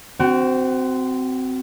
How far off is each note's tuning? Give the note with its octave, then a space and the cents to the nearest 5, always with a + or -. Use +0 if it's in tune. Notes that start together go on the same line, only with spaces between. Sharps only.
C4 -15 F#4 +20